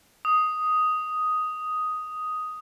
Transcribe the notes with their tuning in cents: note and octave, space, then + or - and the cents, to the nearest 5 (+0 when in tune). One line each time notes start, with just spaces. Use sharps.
D#6 +5